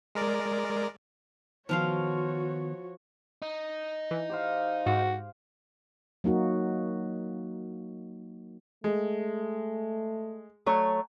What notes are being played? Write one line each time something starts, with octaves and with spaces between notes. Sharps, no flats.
G#3 A#4 D5
D#3 F3 B3 F4 F#4 C5 C#5 F5
D#4
E3
G4 C5 F5
G#2 F#4
F#3 A#3 D#4 F#4
G#3 A3
F#3 A3 C#5